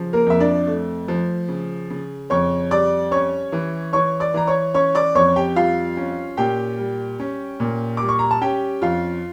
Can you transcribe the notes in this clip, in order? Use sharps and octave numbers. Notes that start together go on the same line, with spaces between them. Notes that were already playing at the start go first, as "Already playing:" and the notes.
Already playing: C#3 F3
A#3 A#4
F2 E5
D4 D5
A3
F3
C#3
C#3
F2 C#5 C#6
G3 D5 D6
C#4 C#5 C#6
E3
E3 C#5 C#6
D5 D6
E3 A#5
C#5 C#6
C#4 C#5 C#6
D5 D6
F2 C#5 C#6
G4 G5
G3 F4 F5
C#4
A#2 G4 G5
G3
C#4
A#2
G3 D6
C#6
A#5
A5
C#4 G4 G5
F2 F4 F5